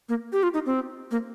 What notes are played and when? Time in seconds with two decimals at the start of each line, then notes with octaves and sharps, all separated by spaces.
0.09 A#3
0.33 G4
0.43 F4
0.54 D#4
0.66 C4
1.11 A#3